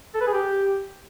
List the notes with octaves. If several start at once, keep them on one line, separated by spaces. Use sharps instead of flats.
A4
B4
G#4
G4